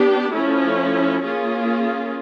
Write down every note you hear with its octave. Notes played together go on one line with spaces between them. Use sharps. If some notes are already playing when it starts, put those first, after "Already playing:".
Already playing: B3 D4 G4
F3 A3 C#4 E4
A#3 C#4 F4 G#4